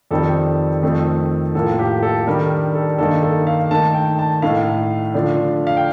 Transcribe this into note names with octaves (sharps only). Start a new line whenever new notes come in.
F2 D#3 G3 C4 A4
F2 D#3 A3 C4
A2 F3 A#3 A4
G4
A4
D#3 G3 D4 A#4
A4
G2 D#3 A#3 D#4 A4
A4
F5
D#3 A3 D#4 A5
G5
A5
A2 A3 D#4 F5
D3 F3 A3 D4
F5
G5